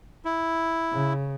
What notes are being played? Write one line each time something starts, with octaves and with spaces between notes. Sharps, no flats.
E4
C#3